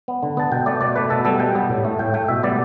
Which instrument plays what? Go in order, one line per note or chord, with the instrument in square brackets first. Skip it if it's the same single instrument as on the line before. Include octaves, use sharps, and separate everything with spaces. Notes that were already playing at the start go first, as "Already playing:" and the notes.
[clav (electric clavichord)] B3
D3
B3 A5
B2 G5
A3 D5
B2 D5
A3 B4
B2 A4
G3 B3 A4
B2 G5
G3 B3
A2
A3
A2 G5
A3 G5
B2 E5
G3 B3 D5